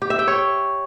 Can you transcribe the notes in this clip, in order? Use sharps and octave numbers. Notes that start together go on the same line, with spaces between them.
G4
E5
G5
C#5